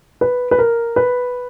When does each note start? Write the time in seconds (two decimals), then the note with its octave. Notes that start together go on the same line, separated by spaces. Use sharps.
0.21 B4
0.51 B4
0.59 A#4
0.96 B4